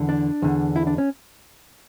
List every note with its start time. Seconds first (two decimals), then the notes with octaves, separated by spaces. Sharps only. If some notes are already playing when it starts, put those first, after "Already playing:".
Already playing: E2 D3
0.09 D4
0.42 E2 D3
0.76 E4
0.87 D4
0.98 C#4